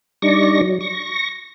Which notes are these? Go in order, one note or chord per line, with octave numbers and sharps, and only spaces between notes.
G3 D4 D#4 D5 C#6 A#6
F#3
C#6 A#6